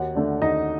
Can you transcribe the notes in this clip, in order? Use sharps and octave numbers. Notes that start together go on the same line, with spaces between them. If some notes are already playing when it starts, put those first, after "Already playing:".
Already playing: D#2 F#4 F#5
D3 A3 D4
D#2 D#4 D#5